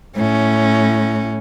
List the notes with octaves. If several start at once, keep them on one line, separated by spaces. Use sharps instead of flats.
A2 C#4